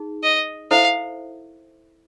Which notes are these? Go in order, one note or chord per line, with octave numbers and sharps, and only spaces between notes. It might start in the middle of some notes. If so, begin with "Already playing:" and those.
Already playing: D#4 G#4
D#5
E4 A4 C5 E5 F5